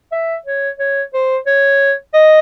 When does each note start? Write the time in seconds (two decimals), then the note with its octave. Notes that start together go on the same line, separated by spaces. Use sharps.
0.12 E5
0.46 C#5
0.79 C#5
1.14 C5
1.47 C#5
2.14 D#5